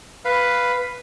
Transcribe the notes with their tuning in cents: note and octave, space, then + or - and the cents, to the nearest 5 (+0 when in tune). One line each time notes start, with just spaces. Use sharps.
B4 +0 F5 +0